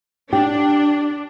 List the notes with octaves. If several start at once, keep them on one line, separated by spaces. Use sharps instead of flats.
D4 G4